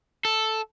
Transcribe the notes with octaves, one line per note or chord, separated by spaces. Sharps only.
A4